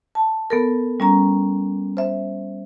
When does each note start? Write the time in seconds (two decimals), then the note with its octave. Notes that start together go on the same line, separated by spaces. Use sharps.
0.15 A5
0.50 B3 A4 A#4
1.00 G3 C#4 A#5
1.97 C5 E5